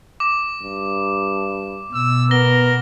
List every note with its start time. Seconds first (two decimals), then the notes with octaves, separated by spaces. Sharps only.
0.20 D6
0.63 G2
1.94 B2 E6
2.31 B3 A#4 A#6 G7